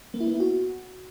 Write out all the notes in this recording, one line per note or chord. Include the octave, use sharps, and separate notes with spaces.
A#3
E4
B3
E4
F#4